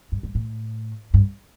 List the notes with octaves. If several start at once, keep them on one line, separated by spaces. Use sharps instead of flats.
G2
G2
A2
G2